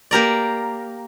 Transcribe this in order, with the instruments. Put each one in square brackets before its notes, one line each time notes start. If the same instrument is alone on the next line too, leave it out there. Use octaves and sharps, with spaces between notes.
[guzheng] A#3 G4 A#4 D5